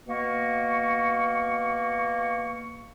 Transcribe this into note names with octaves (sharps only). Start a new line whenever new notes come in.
B2 A#3 C#6